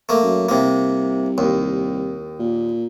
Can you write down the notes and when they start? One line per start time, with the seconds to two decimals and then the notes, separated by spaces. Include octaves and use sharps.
0.09 A3 A#3
0.23 F#2
0.49 C2 C3 A#3
1.38 D#2
2.39 A#2